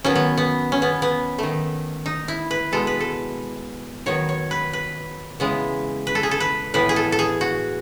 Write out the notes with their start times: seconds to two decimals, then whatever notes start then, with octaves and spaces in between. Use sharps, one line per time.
0.04 D#3 F#3 B3 C#4
0.15 B3
0.37 B3
0.72 C#4
0.82 B3
1.02 B3
1.38 D#3 A3
2.06 D#4
2.28 E4
2.51 B4
2.72 B2 G#3 B3 A4
2.87 B4
3.00 A4
4.06 D#3 F#3 B3 C#5
4.29 C#5
4.51 B4
4.73 B4
5.40 C#3 E3 G#3 B3
6.07 B4
6.15 A4
6.23 G#4
6.31 A4
6.40 B4
6.74 A2 E3 B3 B4
6.89 G#4
6.96 A4
7.12 A4
7.19 G#4
7.41 F#4